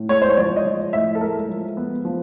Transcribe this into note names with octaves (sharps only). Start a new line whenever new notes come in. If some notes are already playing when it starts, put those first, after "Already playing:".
Already playing: A2
G#3 C#5
C5
C#5
F3 D5
D#5
F3
A2 E5
A4
G#3 A#4
F3
B3
F3